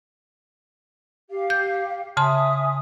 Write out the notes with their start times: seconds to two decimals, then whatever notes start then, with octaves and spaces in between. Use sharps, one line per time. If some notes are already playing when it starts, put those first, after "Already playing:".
1.30 G4 F5
1.50 G6
2.17 C#3 E5 G#5 A5 C6 D#6